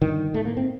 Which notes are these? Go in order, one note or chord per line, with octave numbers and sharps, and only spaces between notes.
G2 D3 D#3
A2 A3
A#3
C4